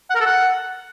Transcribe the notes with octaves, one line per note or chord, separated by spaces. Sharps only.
F#5
A#4
A4
F#5